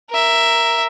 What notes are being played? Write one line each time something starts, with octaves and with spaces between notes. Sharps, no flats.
A#4 E5